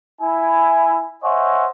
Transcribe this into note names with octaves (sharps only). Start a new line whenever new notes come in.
E4 G#5
C5 C#5 D#5 E5 F#5 G#5